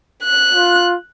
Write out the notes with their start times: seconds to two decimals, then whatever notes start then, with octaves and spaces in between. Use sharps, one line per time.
0.23 F#6
0.53 F4